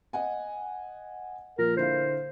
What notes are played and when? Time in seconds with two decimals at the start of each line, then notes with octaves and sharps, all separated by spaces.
0.13 D#5 F#5 G#5
1.58 A#2 F3 A#4
1.77 D3 E4 C5 F5